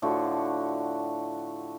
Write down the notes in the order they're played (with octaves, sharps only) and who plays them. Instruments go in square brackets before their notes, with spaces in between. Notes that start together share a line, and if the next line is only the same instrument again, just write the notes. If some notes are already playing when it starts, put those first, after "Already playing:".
[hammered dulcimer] A2 D3 F3 F#4